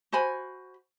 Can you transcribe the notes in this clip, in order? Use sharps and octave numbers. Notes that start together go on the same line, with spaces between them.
F#4 C5 G#5 B5